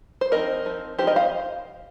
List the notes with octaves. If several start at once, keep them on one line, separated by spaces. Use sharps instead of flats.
C5
F3 C4 D#4 A#4 D#5
F3 C4 D#4
F3 C4 D#4 G4 C5
A#4 D#5
C5 F5